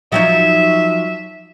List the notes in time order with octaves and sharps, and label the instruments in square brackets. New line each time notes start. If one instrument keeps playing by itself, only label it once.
[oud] F3 F#3 D#4 [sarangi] E5